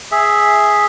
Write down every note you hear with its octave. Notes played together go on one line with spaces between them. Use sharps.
G#4 E5